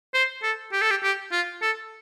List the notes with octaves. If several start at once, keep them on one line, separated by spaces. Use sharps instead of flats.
C5
A4
G4
A4
G4
G4
F4
A4